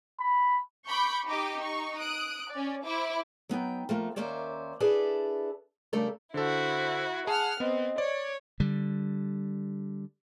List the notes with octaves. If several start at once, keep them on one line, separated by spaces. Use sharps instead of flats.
B5
B5 C#6 D6 G6
D#4 G4 D#5 D6
D#4 C#6
D#6 F#6 D7
C#4 D5
E4 C5 D6
F#3 B3 D#4 G5
F3 A3 A#3
D#2 A#3 C#4 C5 D5 E5
D4 E4 G#4 A4 B4 D5
C#3 G3 A3 D4 A4 A#4
D3 E4 F#4 A4 C5
G#4 F#5 A5 F6
B3 C4 D#5
C#5 D5
D3 G3